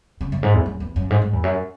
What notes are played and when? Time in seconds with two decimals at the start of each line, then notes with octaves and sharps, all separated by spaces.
0.21 C#3
0.32 F#2
0.43 G#2
0.54 E2
0.66 F#2
0.80 E2
0.96 F#2
1.10 G#2
1.22 G#2
1.33 E2
1.44 F#2